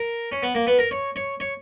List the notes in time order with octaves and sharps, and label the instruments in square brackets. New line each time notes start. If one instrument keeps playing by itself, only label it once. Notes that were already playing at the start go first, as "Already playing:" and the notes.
Already playing: [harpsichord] A#4
C#4
B3
A#3
B3
A#4
C#5
C#5
C#5